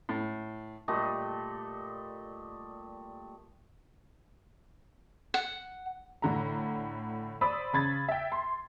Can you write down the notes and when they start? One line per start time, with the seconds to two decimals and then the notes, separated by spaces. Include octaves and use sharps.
0.09 A2
0.88 A#2 G3 A3 D#5
5.34 F#5
6.22 A2 D3 A#5
7.41 C5 D5 B5 D#6 E6
7.73 C#3 B5 G#6 A6
8.08 E5 G5
8.32 C6